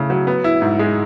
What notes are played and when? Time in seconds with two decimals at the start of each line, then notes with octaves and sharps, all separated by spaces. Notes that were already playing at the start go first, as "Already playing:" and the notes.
Already playing: C#3 A3 E4
0.10 F#3
0.27 B3
0.44 E4
0.62 G#2
0.79 G#3